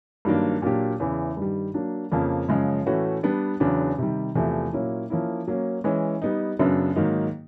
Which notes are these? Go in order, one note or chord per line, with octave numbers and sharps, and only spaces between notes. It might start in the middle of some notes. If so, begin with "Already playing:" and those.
G2 D#3 F#3 A#3 D4
A#2 F#3 A#3 D4 G4
E2 C#3 E3
G2 D#3 G3
F#3 A#3 D4
F2 C#3 F3 A#3
F#2 C#3 F3 G#3
A2 E3 A3 C#4 F#4
G3 B3 D4
E2 C#3 F#3 B3 D4
C3 D#3 G3
E2 C3 F3 A3
A#2 F#3 A#3 C#4 E4
F3 A#3 C#4 E4
F#3 A#3 C#4
E3 G#3 C#4
G3 B3 D#4
F#2 C#3 F#3 B3 D4
G#2 D#3 F#3 A#3 D#4